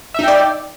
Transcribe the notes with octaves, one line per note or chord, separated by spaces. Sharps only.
D#4 D5 E5 G5